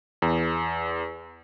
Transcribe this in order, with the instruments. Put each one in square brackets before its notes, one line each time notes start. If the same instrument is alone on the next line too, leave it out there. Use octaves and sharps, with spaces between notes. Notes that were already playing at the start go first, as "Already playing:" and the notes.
[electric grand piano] E2